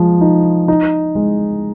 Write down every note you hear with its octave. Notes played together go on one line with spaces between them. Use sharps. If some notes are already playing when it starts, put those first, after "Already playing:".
Already playing: F3 G#3
D#4
D#4
G#3